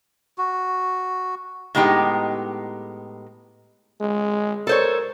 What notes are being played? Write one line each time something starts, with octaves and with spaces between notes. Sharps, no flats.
F#4
A2 G#3 B3 D#4 G4
G#3
A4 A#4 C5 C#5